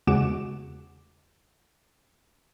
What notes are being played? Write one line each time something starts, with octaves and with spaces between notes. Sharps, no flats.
E2 C#3 G#3 F#4 D6 E7